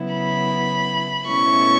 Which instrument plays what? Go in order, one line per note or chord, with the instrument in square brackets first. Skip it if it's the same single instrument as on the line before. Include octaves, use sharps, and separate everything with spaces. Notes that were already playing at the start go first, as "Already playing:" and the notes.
Already playing: [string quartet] C#3 F#3 B3 E4
B5
B2 A3 C#4 E4 C#6